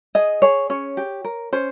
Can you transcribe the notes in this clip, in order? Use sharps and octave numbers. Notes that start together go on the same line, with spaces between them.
G#4 D#5
G#4 C#5
C#4 C#5
G4
A#4
C#4 C5